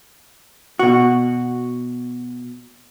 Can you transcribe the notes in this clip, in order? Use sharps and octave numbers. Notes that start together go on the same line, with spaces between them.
B2 F#4